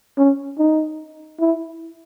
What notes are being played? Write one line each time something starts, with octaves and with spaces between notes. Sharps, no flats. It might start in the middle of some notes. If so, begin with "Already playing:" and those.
C#4
D#4
E4